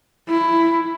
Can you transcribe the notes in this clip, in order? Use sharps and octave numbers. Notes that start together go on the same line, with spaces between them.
E4